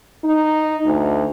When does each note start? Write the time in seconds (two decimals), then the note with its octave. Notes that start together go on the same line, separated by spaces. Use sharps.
0.24 D#4
0.86 D2